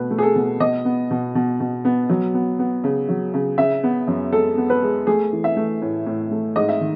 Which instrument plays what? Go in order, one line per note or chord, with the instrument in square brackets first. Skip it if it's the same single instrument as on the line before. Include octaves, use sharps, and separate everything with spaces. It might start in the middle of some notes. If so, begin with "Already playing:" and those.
Already playing: [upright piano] B2 A3 B4
A3
G#4
A4
B2
B2 D#5
B3
B2
B2
B2
B3
F#3
B3
B3
C#3
F#3
C#3
C#3 E5
B3
F#2
G#3 A4
B3
B4
G#3
A3 G#4
E3
E5
A3
A2
A2
A3
G#2 D#5
E5
D#3